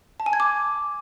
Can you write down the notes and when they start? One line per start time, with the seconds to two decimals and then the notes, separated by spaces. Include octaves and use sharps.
0.20 A5
0.26 G#5
0.33 G#6
0.40 D6